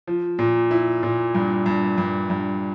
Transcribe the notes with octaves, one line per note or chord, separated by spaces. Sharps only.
F3
A#2
E4
A#2
G2
G2
G2
G2